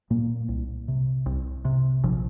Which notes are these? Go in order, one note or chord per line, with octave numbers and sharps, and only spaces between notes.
A#2 A#3
C2
C3
C2
C3
A#1 F3